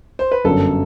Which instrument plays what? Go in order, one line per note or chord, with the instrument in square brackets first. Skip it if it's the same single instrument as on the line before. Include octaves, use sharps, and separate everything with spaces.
[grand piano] C5
B4
[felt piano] G1 F#2 F#3 [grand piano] A4